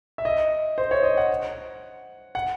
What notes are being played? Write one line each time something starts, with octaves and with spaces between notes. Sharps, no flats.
E5
D#5
C5
C#5
D#5
F#5
F#5